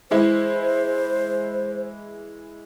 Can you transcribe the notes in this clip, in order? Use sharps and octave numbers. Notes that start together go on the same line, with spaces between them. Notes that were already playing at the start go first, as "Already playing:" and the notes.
E3 G#3 E4 C5